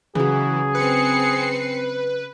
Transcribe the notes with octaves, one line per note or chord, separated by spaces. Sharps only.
C#3 E3 F#3 G#4
C4 B4 C7 C#7